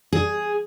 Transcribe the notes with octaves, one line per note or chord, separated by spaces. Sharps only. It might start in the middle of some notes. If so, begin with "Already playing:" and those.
G#4